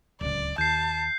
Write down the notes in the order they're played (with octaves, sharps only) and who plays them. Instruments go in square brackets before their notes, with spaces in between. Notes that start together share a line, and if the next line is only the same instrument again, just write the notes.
[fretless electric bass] D1 C#2 [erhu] D5
[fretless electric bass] D#2 [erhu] A5 [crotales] G6 C7